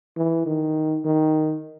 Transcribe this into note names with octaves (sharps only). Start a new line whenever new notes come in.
E3
D#3
D#3